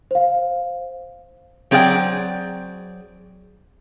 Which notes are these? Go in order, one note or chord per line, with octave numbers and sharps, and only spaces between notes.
C5 F5
F#3 C4 G#4 D5 E5 G5